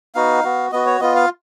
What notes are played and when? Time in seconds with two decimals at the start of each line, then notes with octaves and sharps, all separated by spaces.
0.15 B3 D#4 F#4 F5
0.44 B3 F#4
0.72 B3 F#4 D#5
0.86 C#5
1.01 B3 F4 D#5
1.16 F5